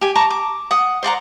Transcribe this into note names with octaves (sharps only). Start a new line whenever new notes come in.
G4 G#5
A5 A#5 C#6 D6
D6
F#5 D#6
C5 D5 F#5 A#5